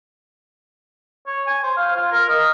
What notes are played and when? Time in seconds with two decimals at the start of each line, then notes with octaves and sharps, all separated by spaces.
1.27 C#5
1.47 G#5
1.64 C5
1.77 F5
1.96 F4
2.12 A#4
2.29 D#5